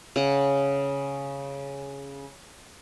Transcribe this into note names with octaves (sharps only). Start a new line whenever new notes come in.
C#3 F#5